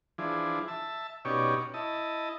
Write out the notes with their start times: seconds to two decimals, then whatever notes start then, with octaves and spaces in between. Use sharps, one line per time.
0.18 E3 F3 D4 G#4
0.68 E5 A5
1.25 B2 C#4 D#4 G4 C#5 D5
1.74 E4 D#5 A5